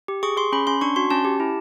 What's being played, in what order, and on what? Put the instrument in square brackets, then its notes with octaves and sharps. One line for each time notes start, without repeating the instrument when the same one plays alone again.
[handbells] G4
G#4 C#6
G#4 C6
C#4 B5
C#4 C6
D4 C#6
F#4 C6
C#4 A5
G4
E4